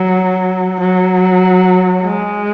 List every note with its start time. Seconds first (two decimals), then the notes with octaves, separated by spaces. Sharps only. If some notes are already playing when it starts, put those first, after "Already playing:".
Already playing: F#3
0.80 F#3
2.03 G#3